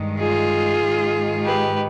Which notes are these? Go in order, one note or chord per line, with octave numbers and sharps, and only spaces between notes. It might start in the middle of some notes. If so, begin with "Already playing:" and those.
Already playing: G2 D#3 G#3
F4 G#4
G#2 D#3 G#3
G4 B4